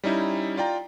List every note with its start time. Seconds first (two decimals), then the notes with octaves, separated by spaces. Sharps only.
0.04 G3 C#4 D#4 E4
0.57 F4 D5 G5 A#5